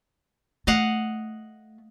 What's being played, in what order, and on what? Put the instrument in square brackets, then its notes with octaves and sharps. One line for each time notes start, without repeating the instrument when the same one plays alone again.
[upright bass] A3 [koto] D#5 F5 F#5